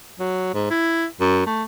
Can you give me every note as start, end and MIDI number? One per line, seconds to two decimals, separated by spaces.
0.20 0.51 54
0.54 0.68 44
0.70 1.05 64
1.21 1.46 42
1.47 1.64 57